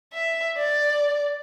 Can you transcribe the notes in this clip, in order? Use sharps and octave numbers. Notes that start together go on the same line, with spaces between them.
E5
D5